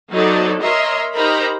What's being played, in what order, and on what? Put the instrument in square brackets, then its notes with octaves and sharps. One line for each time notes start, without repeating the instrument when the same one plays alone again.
[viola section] F#3 B3 D#4 A4 C5 D5
A#4 C#5 D#5 E5 A#5 C6
D#4 G4 A#4 C5 A#5 B5